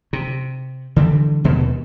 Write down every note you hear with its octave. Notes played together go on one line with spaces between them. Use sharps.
C3
D3 E3 G3
D#2 B2